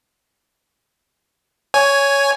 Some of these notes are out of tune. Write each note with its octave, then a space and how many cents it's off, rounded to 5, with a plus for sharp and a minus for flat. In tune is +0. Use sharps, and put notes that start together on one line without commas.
C#5 +10 G#5 +0